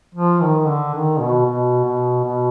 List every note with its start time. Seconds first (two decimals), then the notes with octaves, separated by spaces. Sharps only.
0.15 F3
0.42 D#3
0.67 D3
0.94 D#3
1.20 B2
1.46 B2
1.85 B2
2.25 B2